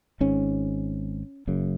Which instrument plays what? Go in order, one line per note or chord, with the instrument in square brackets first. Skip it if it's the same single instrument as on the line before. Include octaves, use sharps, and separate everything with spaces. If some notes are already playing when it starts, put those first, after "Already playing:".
[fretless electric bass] G#1 G#2 C#4
F#1 F#2 C#3